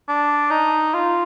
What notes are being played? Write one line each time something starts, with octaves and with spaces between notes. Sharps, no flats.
D4
D#4
F4